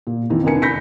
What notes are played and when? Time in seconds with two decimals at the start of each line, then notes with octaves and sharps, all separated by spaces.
0.07 A#2
0.30 F2 D#3 E3
0.43 F1 B3 D4 A#4 G#5 C#7
0.62 B5 G6 A#6 B6 C#7